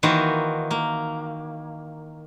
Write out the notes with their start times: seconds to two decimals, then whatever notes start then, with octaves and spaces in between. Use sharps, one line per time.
0.03 D#3 E3 A#3 F#4 C5
0.71 A#3